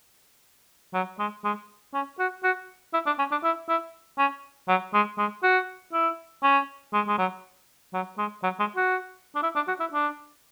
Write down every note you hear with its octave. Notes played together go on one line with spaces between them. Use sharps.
F#3
G#3
G#3
C#4
F#4
F#4
E4
D4
C#4
D4
E4
E4
C#4
F#3
G#3
G#3
F#4
E4
C#4
G#3
G#3
F#3
F#3
G#3
F#3
G#3
F#4
D4
E4
D4
F#4
E4
D4